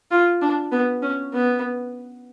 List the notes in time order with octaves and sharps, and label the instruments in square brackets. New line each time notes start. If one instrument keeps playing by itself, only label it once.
[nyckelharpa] F4
D4
B3
C#4
B3